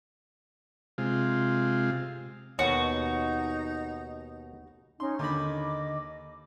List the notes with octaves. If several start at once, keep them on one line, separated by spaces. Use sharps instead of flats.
C3 G#3 F4
D#2 B2 D#4 F#4 C#5
C#4 D#4 C6
D#2 D3 D#5 B5 D6